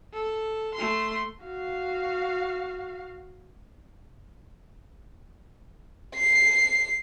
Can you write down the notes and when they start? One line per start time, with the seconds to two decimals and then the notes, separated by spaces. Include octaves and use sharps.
0.14 A4
0.74 A3 C6
1.44 F#4 F5
6.15 C7